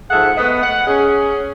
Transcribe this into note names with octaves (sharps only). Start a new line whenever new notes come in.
G#2 F3 G#4 A4 E5 F#5
A3 B3 D#5
F#5
C#4 G#4